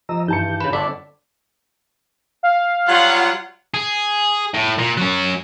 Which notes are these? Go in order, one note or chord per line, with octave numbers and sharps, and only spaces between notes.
F3 D#5 A#5 E6
G2 D#3 E3 G4 A5 G6 C#7
C#3 B4 E7
G1 D4 A4 D5 B6
F5
F#3 G3 F4 F#5
G#4
A2
A#2
F#3 C#4